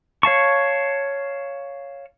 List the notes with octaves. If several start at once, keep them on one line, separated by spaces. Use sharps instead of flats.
C#5 F5 A5 C#6